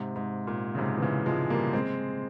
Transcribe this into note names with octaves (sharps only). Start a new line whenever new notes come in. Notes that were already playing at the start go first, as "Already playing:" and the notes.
Already playing: G#2 C3
G#2
A#2
C#3
G#2 C3
E3
A#2 C#3
F3 G#3
G3 A#3
G#3 C4